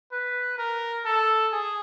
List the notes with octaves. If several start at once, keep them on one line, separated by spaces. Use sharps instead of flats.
B4
A#4
A4
G#4